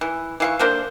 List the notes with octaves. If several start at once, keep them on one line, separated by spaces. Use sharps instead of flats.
E3
E3 F5 C#6
D3 A#3 D4 C5